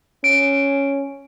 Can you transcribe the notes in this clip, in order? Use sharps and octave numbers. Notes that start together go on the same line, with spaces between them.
C#4 D7